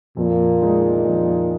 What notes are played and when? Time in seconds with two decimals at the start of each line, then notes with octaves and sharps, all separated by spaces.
0.17 F2 A#2
0.61 D#3 G#3 D#4
1.05 F2